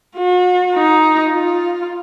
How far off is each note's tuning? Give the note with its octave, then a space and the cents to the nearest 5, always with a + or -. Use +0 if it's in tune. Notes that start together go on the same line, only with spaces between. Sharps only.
F#4 -45
D#4 +10
F4 +10